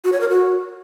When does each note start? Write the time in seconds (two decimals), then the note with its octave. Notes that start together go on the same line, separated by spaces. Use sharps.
0.04 F#4
0.12 C#5
0.21 A#4
0.29 F#4